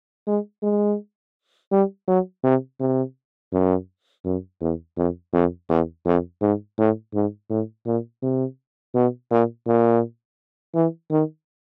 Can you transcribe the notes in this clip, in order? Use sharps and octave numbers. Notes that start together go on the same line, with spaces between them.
G#3
G#3
G3
F#3
C3
C3
F#2
F#2
E2
F2
F2
E2
F2
G#2
A2
G#2
A2
A#2
C3
B2
A#2
A#2
E3
D#3